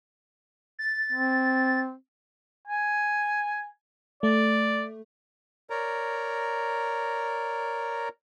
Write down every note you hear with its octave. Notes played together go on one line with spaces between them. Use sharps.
A6
C4
G#5
A3 D5
A#4 C#5 D5 A#5